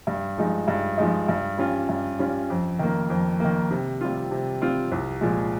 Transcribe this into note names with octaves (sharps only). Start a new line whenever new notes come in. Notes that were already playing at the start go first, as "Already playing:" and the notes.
G2
F3 G#3 D#4
G2
F3 G#3 D#4
G2
G3 C#4 F4
G2
G3 C#4 F4
F2
D#3 A#3
F2
D#3 A#3
C3
G3 C4 F4
C3
G3 C4 F4
C2
A#2 F3 G#3